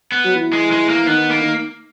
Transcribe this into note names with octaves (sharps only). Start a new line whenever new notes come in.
B3
F#3
E3
G#3
G#3
A#3
D#3 B3
A#3
D#3